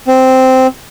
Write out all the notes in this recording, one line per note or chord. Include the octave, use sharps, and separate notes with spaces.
C4